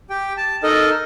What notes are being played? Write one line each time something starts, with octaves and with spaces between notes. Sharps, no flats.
G4 G5
A5
D#4 A4 A#4 D#5